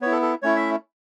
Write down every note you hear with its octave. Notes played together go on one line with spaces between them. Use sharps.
B3 E4 C#5
A4
A4
A3 C#4 E4 C#5
E5